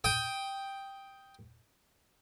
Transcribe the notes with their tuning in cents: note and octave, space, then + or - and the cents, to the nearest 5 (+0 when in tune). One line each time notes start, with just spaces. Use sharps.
G5 +0 D#6 +15